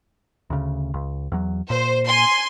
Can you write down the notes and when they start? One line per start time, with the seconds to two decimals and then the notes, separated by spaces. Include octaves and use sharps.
0.50 D2 C#3
0.94 C#2
1.32 E2 F#3
1.70 A#2 C5
2.07 G#5 C6